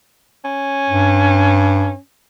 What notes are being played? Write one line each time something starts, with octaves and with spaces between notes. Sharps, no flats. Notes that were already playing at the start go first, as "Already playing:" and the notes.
C#4
G2